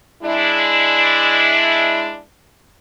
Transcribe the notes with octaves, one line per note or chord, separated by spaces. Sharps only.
G#3 D4 E4